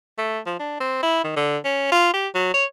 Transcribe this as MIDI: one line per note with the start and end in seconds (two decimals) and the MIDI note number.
0.18 0.39 57
0.46 0.56 53
0.60 0.80 62
0.80 1.02 60
1.03 1.24 64
1.24 1.35 51
1.36 1.57 50
1.65 1.88 61
1.92 2.10 65
2.14 2.28 67
2.35 2.49 54
2.54 2.65 73